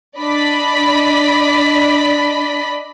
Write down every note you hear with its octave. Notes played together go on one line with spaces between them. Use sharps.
D4 D5 D#5 B5 B6